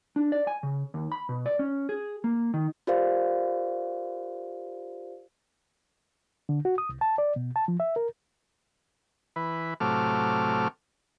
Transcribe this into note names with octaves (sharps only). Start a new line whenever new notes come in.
D4
D5
G#5
C#3
D#2
B5
B2
D5
C#4
G#4
A#3
D#3
F4 G4 A#4 C5 D5 F5
D3
F#4
D#6
C2
A5
D5
B2
A5
F3
E5
A#4
E3 B4
A2 C3 F#3 A3 D6 F6